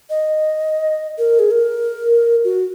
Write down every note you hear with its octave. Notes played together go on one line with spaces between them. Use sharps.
D#5
A#4
G#4
A#4
F#4